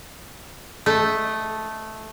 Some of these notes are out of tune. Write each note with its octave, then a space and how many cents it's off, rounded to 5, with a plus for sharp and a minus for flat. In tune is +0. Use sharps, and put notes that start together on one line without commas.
A3 -5 D#5 +0